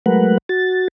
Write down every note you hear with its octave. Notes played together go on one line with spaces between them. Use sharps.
F#3 G#3 A3 A#4 B4 F#5
F#4 A6